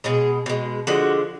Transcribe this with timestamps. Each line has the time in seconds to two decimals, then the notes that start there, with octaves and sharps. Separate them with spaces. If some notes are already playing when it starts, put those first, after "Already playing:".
0.04 B2 G#3 G#4
0.46 B2 G#3
0.87 D3 F3 G#3 F#4